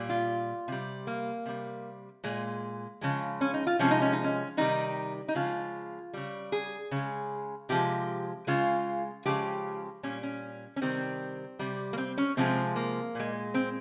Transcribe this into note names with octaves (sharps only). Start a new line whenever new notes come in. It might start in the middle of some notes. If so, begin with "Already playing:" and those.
Already playing: A#2 G3
F4
C3 G3
A#3
C3 G3
A#2 G#3
C#3 F3 G#3
C#4
D#4
F4
C3 F3 G#3 C#4
D#4
C#4
D#4
C#4
C3 D#3 G3 D#4
D#4
C#3 F3 G#3 F4
C#3 G3
G#4
C#3 G#3
C3 F3 G#3 G4
C#3 G#3 F4
C#3 F3 G#3 G4
A#2 G3 C#4
C#4
C#4
C3 D#3 G3 C4
C3 G3
A#3
C4
C#4
C3 F3 G#3 C4
A#3
A#2 G#3
C4